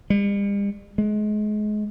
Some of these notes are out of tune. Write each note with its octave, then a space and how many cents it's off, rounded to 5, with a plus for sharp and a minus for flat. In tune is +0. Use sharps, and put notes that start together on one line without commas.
G3 +45
G#3 +30